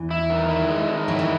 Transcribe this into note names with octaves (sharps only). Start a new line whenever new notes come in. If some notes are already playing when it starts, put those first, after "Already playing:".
Already playing: E2 E3
E4
D#3
E4
G#3
D#3
F#3 E4
E3